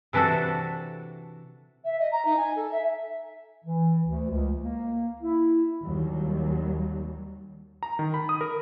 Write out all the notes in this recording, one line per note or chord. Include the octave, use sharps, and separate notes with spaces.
C3 E3 D4 F#4 A4
E5
D#5
A#5
D#4
G#5
A4
E5
E3
D2
C#2
A#3
E4
D#2 F#3 G3
A#5
D#3
B5
D#6
A#4